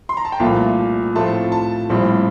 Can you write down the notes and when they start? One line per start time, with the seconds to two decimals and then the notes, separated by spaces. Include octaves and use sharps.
0.09 C6
0.17 A#5
0.25 A5
0.32 G5
0.40 C2 A#2 F3 A3 F5
1.15 A2 F3 A3 C4 F4 A5
1.52 A5
1.90 A#1 A2 G3 C4 F4